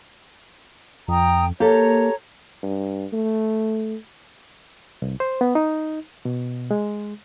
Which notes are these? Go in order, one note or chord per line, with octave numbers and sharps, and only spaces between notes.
F2 G5 A#5 D#6
A#3 G4 A4 C#5 A#5
G2
A3
C2
C5
B3
D#4
B2
G#3